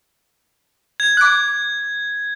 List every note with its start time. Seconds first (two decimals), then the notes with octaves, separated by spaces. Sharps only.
1.00 G#6
1.17 D6 F#6